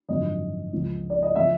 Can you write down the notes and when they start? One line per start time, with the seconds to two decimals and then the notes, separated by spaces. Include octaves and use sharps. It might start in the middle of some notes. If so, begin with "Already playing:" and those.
0.08 G#1 F#2 D3 F3 D#5
0.73 C#2 C#3 F3
1.10 D5
1.22 D#5
1.35 C#3 F3 E5